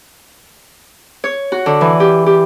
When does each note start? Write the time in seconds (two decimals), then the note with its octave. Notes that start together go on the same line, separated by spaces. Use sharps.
1.24 C#5
1.52 F#4
1.66 D3
1.81 E3
2.00 G4
2.26 G4